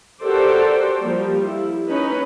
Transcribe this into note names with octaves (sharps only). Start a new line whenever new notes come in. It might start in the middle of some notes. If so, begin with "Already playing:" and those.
F#4 G4 A4 A#4 C5 D5
F3 G3 A#3
E4
C#4 D#4 B4